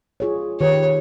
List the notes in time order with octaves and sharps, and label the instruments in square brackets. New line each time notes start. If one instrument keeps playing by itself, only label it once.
[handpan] F4 G#4 C#5
[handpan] D#3 G4 B4 [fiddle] C#5